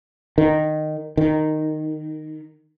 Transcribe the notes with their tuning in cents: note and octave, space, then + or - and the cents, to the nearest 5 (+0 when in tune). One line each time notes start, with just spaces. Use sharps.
D#3 -15
D#3 -10